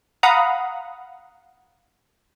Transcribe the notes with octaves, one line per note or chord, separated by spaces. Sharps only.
F5 F#5 A#5 B5 D#6